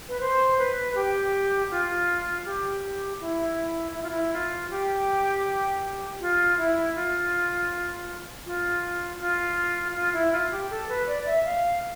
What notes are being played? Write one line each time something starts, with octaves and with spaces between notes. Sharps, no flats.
B4
C5
B4
G4
F4
G4
E4
E4
F4
E4
F4
G4
F4
E4
F4
F4
F4
F4
E4
F4
G4
A4
B4
D5
E5
F5